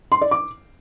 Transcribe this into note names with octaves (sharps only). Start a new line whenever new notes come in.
C6
D5
D6